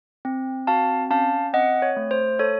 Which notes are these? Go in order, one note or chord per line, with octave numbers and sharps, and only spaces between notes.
C4
F#4 F5 A5
C#4 F5 A5
C4 D#5 F#5
C#5
A3
C5
A4 C#5